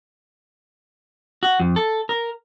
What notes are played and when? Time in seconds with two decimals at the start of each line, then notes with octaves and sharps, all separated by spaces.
1.43 F#4
1.60 F2
1.76 A4
2.09 A#4